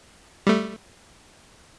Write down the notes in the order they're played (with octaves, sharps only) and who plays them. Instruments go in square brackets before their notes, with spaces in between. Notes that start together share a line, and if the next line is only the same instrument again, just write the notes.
[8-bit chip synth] G3 A3